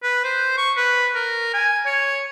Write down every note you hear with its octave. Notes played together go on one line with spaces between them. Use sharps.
B4
C5
C#6
B4
A#4
G#5
C#5